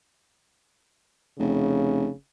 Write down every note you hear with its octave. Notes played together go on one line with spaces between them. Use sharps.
F1 C#3